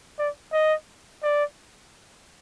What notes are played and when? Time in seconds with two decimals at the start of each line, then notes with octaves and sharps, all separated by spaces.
0.18 D5
0.53 D#5
1.23 D5